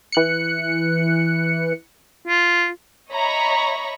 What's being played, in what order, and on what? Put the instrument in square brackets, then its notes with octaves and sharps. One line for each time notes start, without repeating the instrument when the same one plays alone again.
[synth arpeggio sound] E3 F#6 C#7
[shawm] F4
[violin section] C#5 D#5 E5 A#5 B5 C#6